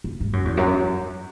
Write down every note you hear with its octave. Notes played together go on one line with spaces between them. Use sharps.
F#2
G#2
F#2
E2
F#2